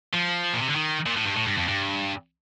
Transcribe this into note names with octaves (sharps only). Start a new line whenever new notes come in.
F3
A#2
C3
D3
D#3
A#2
A2
G2
A2
G2
F2
G2